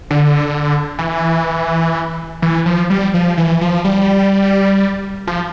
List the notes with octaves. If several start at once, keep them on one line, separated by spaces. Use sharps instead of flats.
D3
E3
E3
F3
G3
F3
E3
F3
G3
F3